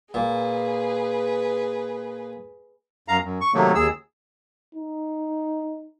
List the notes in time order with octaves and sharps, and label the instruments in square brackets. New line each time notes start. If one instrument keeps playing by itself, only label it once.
[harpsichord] A#2 [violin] G#4 B4
[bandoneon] F#2 F5 A#5
F#2
C#6
C3 D#3 F#3 A3 A#3
D#2 G#4 E6
[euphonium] D#4